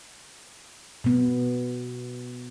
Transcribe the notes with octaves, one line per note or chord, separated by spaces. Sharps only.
B2 B3